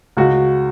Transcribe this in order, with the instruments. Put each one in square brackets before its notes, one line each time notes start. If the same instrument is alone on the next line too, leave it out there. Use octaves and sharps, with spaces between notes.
[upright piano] C#2 F#4